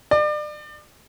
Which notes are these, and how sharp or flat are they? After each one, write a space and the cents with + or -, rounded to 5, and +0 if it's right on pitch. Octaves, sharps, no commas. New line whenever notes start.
D5 +35